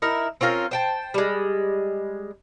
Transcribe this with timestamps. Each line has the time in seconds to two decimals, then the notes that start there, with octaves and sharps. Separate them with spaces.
0.02 D#4 E4 A#4
0.41 C4 C#4 F4 A#4
0.71 C5 G5 A5
1.14 G3 G#3